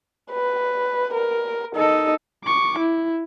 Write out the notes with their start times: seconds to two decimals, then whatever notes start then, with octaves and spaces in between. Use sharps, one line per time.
0.32 B4
1.14 A#4
1.75 D#4 A4 D#5
2.45 C#6 D6
2.79 E4